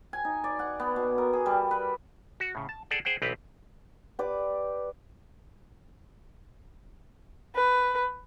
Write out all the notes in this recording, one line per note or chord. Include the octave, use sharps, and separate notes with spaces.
G#5
D#4
D5
F#5
B3
B2
A#4
G#4
G3
B4
F#4
A2 C#3
A5
G#4 A4 D5 F#5 G5
G#4 C5 F#5 G5
B1 E3 B3 C4 G4 B4
G4 B4 D5 D6
B4